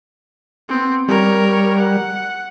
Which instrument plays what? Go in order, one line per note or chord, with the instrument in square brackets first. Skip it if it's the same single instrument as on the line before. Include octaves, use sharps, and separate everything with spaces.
[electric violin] B3 C4
[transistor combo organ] G3 [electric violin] A#4 C#5
[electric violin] F#5